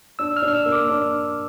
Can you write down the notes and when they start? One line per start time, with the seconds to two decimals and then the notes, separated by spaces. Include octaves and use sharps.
0.19 D4 E6
0.37 F6
0.42 D4
0.48 F6
0.54 E6
0.66 A#3
0.72 D6
0.89 D4